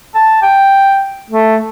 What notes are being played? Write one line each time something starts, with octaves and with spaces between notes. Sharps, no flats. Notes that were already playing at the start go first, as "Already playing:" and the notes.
A5
G5
A3